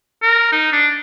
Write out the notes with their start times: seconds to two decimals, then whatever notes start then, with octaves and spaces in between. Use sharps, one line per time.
0.22 A#4
0.52 D#4
0.73 D4